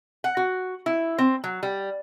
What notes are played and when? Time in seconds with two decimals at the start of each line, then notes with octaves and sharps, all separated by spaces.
0.24 F#5
0.37 F#4
0.86 E4
1.18 C4
1.44 F#3
1.63 G3